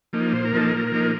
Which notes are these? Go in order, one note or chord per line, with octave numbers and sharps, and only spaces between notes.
F3 A#3 D#4
A#2 C5
A#4
F3 A#3 D#4 A4
A#2 A#4
F3 A#3 D#4